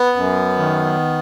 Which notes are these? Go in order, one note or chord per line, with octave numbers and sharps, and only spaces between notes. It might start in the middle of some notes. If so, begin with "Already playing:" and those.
Already playing: B3
F#2
D#3